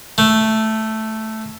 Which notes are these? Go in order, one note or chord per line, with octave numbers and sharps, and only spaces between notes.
A3